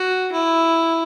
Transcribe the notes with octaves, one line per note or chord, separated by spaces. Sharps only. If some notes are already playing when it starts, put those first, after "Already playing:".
Already playing: F#4
E4